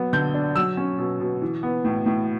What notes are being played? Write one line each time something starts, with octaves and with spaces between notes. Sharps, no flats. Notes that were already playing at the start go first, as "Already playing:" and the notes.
Already playing: F#3 B3
D3 G6
D4
F#3 E6
C#4
B2
B2
E3
B3
A2
A2